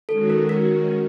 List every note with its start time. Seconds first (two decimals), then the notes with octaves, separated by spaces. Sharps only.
0.09 D#3 G#3 C#4 F#4 A4
0.30 A#4
0.49 A#4